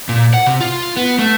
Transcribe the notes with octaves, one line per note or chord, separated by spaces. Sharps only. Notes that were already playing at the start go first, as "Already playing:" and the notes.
A#2
F#5
C3
F4
B3
A3